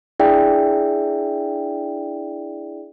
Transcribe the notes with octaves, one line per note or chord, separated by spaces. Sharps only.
D4 E4 G#4 D5 E5 G5